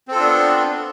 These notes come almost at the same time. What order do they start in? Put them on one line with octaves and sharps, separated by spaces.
C4 A4 F4 D4 B3